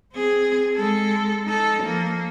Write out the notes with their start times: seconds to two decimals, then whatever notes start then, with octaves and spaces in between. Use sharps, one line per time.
0.13 C4 G#4
0.76 G#3 A4
1.45 D#4 A4
1.83 F3 A#3